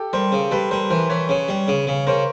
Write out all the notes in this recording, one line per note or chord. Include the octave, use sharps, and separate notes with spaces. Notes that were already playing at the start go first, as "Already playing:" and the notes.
Already playing: G4 A4
G3 A#4 C5
C#3
G3 A4 B4
G3 A#4 C5
E3 A#4 C5
E3 B4 C#5
C#3
G3
C#3
C#3
C#3 A#4 C5